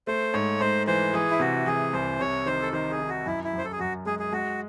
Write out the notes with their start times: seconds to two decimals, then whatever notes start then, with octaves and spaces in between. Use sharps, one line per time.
0.07 A3 C5
0.33 G#2 C#5
0.60 G#2 C5
0.87 E3 C5
1.14 E3 G#4
1.31 E4
1.40 C3 F#4
1.66 E3 G#4
1.93 C2 C5
2.20 C3 C#5
2.46 D#3 C5
2.62 A4
2.73 D#3 C5
2.91 G#4
2.99 D#3
3.09 F#4
3.26 F#2 E4
3.44 E4
3.53 F#2 C5
3.65 A4
3.72 G#4
3.79 F#2 F#4
4.06 G#3 G#4
4.19 G#4
4.33 G#3 F#4